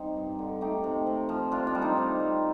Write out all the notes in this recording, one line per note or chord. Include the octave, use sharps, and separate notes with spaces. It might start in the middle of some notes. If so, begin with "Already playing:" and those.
Already playing: G3 C4 D#4
G2
D3
A3 D#4 G4
C3
C3
F3
C3 D4 F4
D4 F4
G3
C4 D#4
C3
G3